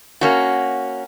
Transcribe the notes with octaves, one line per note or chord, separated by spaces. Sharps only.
A#3 C#4 F#4